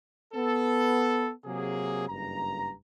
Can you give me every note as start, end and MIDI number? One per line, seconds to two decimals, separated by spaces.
0.33 1.31 59
0.33 1.31 69
1.45 2.05 48
1.45 2.05 54
1.45 2.05 58
1.45 2.05 68
2.08 2.72 30
2.08 2.72 43
2.08 2.72 82